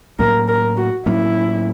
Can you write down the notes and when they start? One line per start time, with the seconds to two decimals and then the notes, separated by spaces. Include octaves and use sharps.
0.19 A2 F#3 A#3 C#4 A#4
0.48 A#4
0.77 F#4
1.06 A2 F#3 A#3 C#4 E4